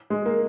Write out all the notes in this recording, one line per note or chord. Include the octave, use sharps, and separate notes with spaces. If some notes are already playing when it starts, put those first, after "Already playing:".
G#3
A#3